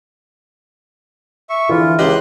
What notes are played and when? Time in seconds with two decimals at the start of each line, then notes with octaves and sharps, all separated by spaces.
1.50 E5 C#6
1.69 E2 D3 E3 F3 E4 F4
1.99 C#2 G4 D#5 C6 F#6